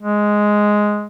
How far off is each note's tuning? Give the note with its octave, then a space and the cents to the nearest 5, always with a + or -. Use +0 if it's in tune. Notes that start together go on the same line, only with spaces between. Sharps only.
G#3 +5